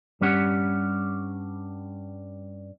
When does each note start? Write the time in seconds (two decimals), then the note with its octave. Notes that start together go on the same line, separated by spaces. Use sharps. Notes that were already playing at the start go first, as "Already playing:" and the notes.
0.21 G2 G3 C#4 G4 F#5